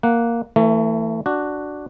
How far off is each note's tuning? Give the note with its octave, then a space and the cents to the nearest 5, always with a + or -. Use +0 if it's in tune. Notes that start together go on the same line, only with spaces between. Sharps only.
A#3 +0 F#5 +0
E3 +0 A3 +30
D4 +0 F#4 +5